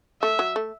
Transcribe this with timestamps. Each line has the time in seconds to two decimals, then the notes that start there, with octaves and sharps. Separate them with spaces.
0.22 A3 E5
0.39 F#3
0.56 A3